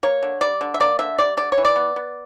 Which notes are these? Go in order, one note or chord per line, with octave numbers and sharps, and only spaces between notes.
A#3 C#5
D3
G3 D5
D3
E5
A#3 D5
D3 E5
G3 D5
D3 D5
C#5
E3
D5
B3
B3